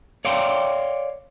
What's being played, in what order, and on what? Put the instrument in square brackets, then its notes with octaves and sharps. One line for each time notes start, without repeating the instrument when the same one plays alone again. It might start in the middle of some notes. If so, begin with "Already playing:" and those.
[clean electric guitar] C#5 D5 F5 G5 C6